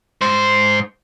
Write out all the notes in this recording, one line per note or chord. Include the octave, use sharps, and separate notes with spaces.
G#2 C5